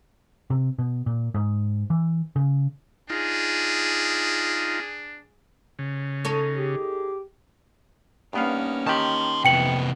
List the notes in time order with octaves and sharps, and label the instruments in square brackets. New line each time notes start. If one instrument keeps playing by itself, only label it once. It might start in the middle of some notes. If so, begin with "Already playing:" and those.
[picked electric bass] C3
B2
A#2
G#2
E3
C#3
[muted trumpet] D4 [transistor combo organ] D#4 F4 [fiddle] G#4
[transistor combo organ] C#3
[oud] D#4 A4 C#5
[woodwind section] G4 G#4
[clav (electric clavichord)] G2 B3 F5 [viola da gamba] A#3 C#4 D#4
[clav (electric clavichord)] D#3 G4 [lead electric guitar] A5 C6
[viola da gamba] F2 E3 B3 [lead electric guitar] C3 B4 [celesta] G5 C#7 F#7